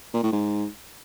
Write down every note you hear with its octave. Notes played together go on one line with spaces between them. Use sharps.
A#2
A2
G#2